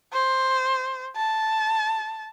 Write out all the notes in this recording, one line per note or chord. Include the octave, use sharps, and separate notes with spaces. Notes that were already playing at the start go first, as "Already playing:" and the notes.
C5
A5